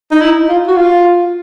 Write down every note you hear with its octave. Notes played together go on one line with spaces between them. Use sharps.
D#4
E4
F4
F#4
F4